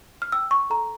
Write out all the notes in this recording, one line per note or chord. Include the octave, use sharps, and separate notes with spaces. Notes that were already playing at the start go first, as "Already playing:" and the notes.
F6
G5 E6
C#6
A4 A#5